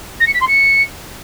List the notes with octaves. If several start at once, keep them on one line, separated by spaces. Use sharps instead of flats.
A#6
C#7
B6
C6
C#7